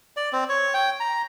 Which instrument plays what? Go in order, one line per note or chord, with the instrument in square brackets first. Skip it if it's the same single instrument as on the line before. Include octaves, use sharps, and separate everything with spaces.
[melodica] D5
C4
C#5
G5
A#5